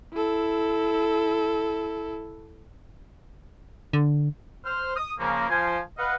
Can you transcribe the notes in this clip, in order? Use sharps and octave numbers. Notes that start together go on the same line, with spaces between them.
E4 A4
D3
C5 F6
D#6
C#3 F3 A#3
F3 F4 C5 G#5
B4 D#5 F5 F#5